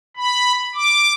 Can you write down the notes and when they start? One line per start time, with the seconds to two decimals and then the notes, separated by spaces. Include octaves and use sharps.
0.17 B5
0.75 D6